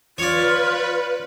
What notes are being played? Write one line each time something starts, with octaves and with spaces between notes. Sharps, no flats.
F4 B4 C#5 D5